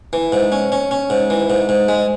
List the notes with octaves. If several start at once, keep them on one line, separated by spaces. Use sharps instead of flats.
E3
G#2
C#4
C#4
C#4
G#2
E3
G#2
G#2
G#3